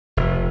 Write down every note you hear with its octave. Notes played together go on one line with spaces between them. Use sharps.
F1